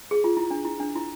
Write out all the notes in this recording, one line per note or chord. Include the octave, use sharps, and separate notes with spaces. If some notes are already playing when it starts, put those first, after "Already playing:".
G#4
F4
E4
D4
E4
D4
E4